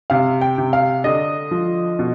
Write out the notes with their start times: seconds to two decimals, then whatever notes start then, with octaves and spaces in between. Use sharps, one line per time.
0.10 C3 F5
0.41 G5
0.58 C3
0.73 F5
1.04 D3 D#5
1.51 F3
1.99 B2